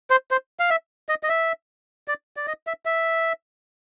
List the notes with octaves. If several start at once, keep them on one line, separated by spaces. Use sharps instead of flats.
C5
C5
F5
E5
D#5
D#5
E5
D5
D5
D#5
E5
E5